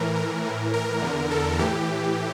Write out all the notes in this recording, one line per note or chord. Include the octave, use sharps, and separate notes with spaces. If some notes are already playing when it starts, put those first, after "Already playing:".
Already playing: A2 E3 A#4
A#4
A2 E3
A#4
E2 D3
A4
A2 E3 G4